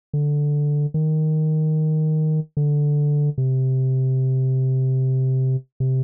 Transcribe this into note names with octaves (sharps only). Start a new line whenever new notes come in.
D3
D#3
D3
C3
C3